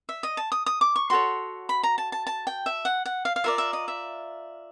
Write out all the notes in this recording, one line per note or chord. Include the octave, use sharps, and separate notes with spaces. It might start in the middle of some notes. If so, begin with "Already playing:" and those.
E5
D#5
A5
D#6
D#6
D6
C#6
F#4 A4 C#5 C6
B5
A#5
A5
A5
A5
G5
E5
F#5
F#5
F5
F5
F4 A#4 D5 E5
E5
D#5
E5